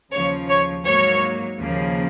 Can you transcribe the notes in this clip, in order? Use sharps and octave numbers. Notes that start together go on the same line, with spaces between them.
D#2 C#3 F3 C#5
C#5
G#2 F#3 A#3 C#5
D#2 C#3 F3 A#3